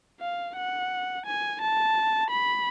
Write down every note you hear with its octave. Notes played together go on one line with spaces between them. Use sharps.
F5
F#5
G#5
A5
B5